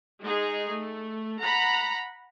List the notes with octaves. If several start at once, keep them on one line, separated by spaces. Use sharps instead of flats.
G#3 D#4 G#4
A3
F#5 A#5 B5